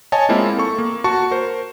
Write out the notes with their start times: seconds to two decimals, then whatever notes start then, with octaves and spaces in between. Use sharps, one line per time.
0.12 C#5 D#5 G#5 A5
0.29 G#3 A#3 C4 E4 F4
0.58 A4 C#6
0.78 A#3
1.04 F#4 A5 C#6
1.31 A#4 C5